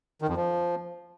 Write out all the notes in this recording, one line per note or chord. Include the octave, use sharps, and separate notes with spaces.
D#3
F2
F3